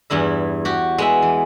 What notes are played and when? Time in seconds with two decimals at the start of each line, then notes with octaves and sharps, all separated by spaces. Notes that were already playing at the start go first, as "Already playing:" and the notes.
0.10 E2 G2 E4 E5
0.65 F#4 G4
0.98 G#3 B3 E5
1.22 E3